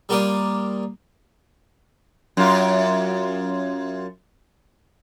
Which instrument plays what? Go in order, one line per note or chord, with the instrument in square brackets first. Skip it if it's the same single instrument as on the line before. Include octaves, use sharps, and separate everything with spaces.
[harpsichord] G3 A#3 F4 G4 D5 D#6
[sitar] F#2 F4